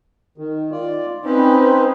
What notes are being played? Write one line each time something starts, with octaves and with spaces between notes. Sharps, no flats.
D#3
F4 D5
C4 C#4 D#4 B4 C5